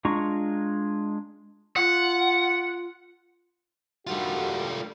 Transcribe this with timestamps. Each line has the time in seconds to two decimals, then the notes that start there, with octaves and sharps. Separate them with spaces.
0.05 G#3 D4 F4 A#5 C#6
1.77 F4 F#5
4.07 D3 D#3 G3 A3 F4 F#4